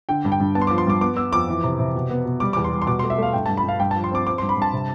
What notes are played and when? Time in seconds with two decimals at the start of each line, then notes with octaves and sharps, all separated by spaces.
0.09 D3 G5
0.25 G2
0.32 G5
0.40 G2
0.55 B3 A5
0.62 C6
0.67 F3 D6
0.78 C6
0.87 G2 D6
1.01 B3 D6
1.17 B3 E6
1.32 F2 D6
1.48 E3
1.64 C3
1.79 C3
1.95 B2
2.10 B3
2.25 B2
2.40 G3 D6
2.53 E2 D6
2.64 C6
2.72 G3
2.82 C6
2.87 B2 D6
2.99 A3 C6
3.10 E5
3.18 A3 F5
3.33 G2 G5
3.46 G2 A5
3.57 B5
3.64 G2 F5
3.79 G2 G5
3.91 F3 A5
4.04 C6
4.12 C4 D6
4.26 C4 D6
4.38 G2 C6
4.49 B5
4.57 G2
4.62 A5
4.73 C3